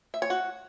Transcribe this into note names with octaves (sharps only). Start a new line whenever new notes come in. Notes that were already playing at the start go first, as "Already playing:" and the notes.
E5
C#5
F#4